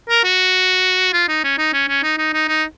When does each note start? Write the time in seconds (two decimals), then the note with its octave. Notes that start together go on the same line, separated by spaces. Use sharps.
0.09 A#4
0.24 F#4
1.13 F4
1.29 D#4
1.44 C#4
1.58 D#4
1.73 C#4
1.88 C#4
2.03 D#4
2.18 D#4
2.33 D#4
2.48 D#4